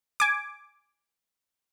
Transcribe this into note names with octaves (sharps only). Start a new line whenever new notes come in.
G#5 D6